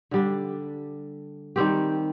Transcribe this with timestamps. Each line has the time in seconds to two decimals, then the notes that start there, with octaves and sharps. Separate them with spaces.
0.11 D3 G3 D4
1.56 D#3 G3 C4 G4